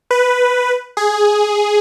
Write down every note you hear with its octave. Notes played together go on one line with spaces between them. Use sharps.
B4
G#4